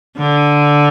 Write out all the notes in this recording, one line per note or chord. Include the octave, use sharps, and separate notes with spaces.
D3